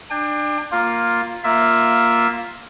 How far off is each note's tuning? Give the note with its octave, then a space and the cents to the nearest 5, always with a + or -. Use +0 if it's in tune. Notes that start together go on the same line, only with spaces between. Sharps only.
D4 +25 G5 +40
A#3 +0 F4 +5
A#3 +0 F4 +0 E5 +0